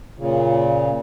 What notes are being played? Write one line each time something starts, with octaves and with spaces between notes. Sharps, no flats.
A#2 C#3